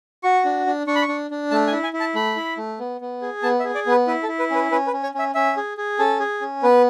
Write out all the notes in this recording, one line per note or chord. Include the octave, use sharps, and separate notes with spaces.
F#4 C#6
D4
D4
D4 C#6
B5
C#6
D4
D4
A3 A5
G#5
E4
G#5
E4
A5
A3 B5
E4
A3
B3
B3
G#4
B3 A5
E5
G#4
D5
B3 B4
E4 B4
A4
E4
B4
C#4 B4
C#4 B4
B4
C#4
C#5
C#4 E5
C#4 E5
G#4
G#4
C#4 A4
G#4
C#4
B3 B4